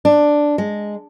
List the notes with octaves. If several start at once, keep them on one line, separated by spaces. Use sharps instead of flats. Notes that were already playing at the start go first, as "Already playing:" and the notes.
D4
G#3